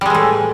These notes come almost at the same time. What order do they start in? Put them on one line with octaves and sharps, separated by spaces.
G3 G#3 E3 A2